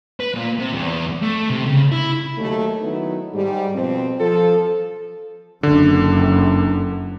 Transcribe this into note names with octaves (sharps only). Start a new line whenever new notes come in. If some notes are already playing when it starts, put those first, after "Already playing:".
B4
A#2
C3
E2
A3
C3
C#3
E4
D#2 F#3 A3
D#3 F#3 B3 D#4 E4
G#2 G3
F2 B2 C4
F3 A4
F#1 F#2 D3